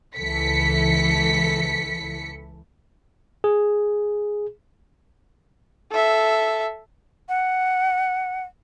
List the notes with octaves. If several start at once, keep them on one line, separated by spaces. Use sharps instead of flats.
C#2 E3 A4 B6 C#7
G#4
A4 E5
F#5